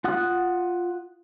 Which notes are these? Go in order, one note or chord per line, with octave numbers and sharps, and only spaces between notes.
F4 F#5 D#6 F#6